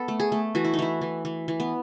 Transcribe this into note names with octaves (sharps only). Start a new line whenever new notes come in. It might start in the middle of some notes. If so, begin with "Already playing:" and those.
Already playing: B3 A4
A3
G#4
A3
E3 F#4
E4
D#4
E3 E4
E3
E3
E3
B3